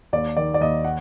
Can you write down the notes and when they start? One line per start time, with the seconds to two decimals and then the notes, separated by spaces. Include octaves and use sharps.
0.13 D#2 D5
0.37 D#3 D5
0.54 D5
0.60 D#2 D#5
0.84 F#5